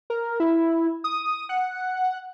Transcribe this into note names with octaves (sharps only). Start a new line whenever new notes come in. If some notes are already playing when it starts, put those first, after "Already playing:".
A#4
E4
D#6
F#5